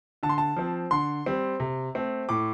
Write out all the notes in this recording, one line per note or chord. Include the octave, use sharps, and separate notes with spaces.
D3 A5
C6
A5
F3 C4
D3 C6
G3 C4
C3
A3 C4
A2 D6